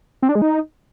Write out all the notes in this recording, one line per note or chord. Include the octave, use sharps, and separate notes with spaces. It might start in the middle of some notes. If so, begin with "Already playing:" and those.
C4
D4
G#3
D#4